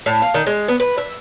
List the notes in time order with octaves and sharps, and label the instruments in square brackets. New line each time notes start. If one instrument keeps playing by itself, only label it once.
[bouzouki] A2
F5
D#3
G#3
B3
B4
E5